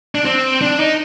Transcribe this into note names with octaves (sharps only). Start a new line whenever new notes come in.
D4
C4
D4
D#4